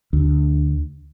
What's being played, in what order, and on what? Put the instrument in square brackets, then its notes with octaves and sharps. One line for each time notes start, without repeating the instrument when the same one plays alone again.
[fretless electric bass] D2